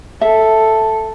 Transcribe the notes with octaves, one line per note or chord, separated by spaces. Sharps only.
A4 E5